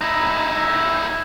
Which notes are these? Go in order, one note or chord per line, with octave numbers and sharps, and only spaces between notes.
D#4 E4